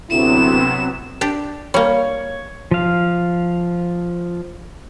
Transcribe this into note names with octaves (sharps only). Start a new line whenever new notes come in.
D2 C3 F#3 B3 C4 E4 E7
D4 G4
G3 A#3 C#5
F3 F5